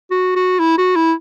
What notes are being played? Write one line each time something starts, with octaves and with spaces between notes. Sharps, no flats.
F#4
F#4
E4
F#4
E4